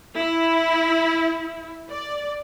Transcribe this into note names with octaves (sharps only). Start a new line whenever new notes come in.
E4
D5